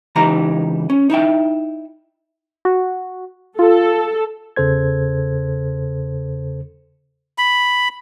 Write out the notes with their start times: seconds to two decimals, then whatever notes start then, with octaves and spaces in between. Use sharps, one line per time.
0.16 C#2 E3 D#4 G4 A#5
0.90 C#4
1.10 D#4 E4 E5 G5
2.65 F#4
3.59 F4 A4
4.56 E2 C#3 A4 C5 G#6
7.38 B5